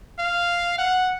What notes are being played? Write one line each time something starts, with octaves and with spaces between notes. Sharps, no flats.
F5
F#5